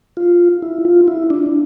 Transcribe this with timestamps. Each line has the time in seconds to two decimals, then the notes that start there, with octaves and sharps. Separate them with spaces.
0.17 F4
0.62 E4
0.85 F4
1.08 E4
1.30 D4